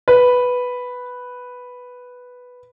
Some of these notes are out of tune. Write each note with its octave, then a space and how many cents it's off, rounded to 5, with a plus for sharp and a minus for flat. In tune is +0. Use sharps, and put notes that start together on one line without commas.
B4 +0